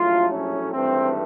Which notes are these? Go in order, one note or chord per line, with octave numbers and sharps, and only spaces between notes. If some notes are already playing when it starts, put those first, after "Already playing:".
Already playing: A#1 A2 F#3 A3 F4
C#4
G#1 G2 E3 A3 C4